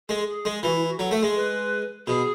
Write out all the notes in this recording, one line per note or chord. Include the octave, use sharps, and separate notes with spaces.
G#3 A4
G#4
G#3
E3 F#4
E4
F#4
F#3 A4
A3
G#3
B4
B2 G#4